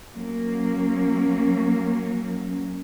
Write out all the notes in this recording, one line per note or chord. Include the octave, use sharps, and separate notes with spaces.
F#3 A#3 C#4